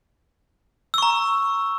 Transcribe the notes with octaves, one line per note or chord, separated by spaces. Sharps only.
A#5 C#6 E6